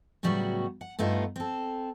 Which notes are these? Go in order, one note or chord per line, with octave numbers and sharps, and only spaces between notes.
A2 C#3 F#3 G3 B3 F#4
F#5
G2 A3 B3 D#4 F4
C4 A4